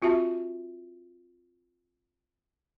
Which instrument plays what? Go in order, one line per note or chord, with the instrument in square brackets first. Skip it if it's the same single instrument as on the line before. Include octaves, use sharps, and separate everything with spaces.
[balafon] C4 F4 F#4 E5 A5